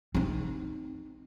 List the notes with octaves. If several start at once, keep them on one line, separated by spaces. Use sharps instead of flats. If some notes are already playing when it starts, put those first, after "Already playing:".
C4 D#4